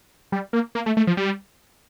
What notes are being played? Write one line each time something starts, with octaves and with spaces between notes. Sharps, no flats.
G3
A#3
A#3
A3
A3
F3
G3